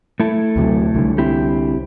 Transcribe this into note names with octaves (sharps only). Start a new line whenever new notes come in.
A3 E4 A4
D2 C3 F#3
C2 D3
C4 E4 G4